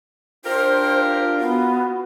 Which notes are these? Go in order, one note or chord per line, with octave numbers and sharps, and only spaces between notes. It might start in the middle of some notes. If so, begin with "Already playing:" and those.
D4 F4 G4 A#4 C5
B3 F#4